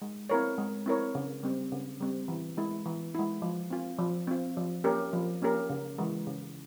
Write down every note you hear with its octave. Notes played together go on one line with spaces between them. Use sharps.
G#3
C4 E4 A#4 C#5
G#3
C4 E4 A#4 C#5
C#3
G3 C4
C#3
G3 C4
E3
G#3 E4
E3
G#3 E4
F3
C4 F4
F3
C4 F4
F3
A#3 C#4 G4 A#4
F3
A#3 C#4 G4 A#4
C#3
E3 G#3
C#3